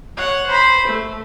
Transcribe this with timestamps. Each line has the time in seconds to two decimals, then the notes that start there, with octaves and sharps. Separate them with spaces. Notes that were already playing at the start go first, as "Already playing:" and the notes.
0.17 C#5 F#5
0.47 C5 B5
0.87 A3